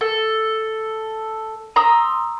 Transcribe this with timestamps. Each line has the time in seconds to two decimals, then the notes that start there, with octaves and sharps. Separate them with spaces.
0.01 A4
1.76 A#5 C6 D#6 E6